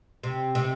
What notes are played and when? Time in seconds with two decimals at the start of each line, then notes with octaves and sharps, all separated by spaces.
0.23 C3
0.55 C3